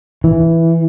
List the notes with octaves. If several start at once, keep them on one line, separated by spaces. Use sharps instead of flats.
E3